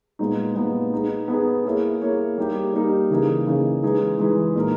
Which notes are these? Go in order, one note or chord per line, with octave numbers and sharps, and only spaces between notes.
A#2 G#3 B3 D#4
A#2 G#3 B3 D#4
B3 D#4 G#4
B3 D#4 G#4
A#3 E4 G#4 C#5
A#3 E4 G#4 C#5
G3 A#3 D#4 G4
G3 A#3 D#4 G4
C#3 E3 A#3 D#4 G#4
C#3 E3 A#3 D#4 G#4
E3 G#3 D#4 G#4 B4
E3 G#3 D#4 G#4 B4
A#2 A#3 D#4 A#4